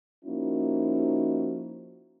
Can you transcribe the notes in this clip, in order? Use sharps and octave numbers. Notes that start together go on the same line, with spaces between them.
F3 A#3 C#4 D#4 E4 F#4